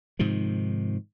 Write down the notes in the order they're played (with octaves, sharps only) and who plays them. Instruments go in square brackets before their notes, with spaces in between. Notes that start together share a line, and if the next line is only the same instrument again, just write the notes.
[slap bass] G#2 C3 D#3 F3